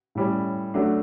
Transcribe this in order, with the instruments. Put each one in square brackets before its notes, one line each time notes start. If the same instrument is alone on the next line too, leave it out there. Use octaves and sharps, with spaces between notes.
[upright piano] A2 G3 C#4
F#3 A3 D4